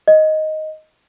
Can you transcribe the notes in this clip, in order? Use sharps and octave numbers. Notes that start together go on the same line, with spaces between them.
D#5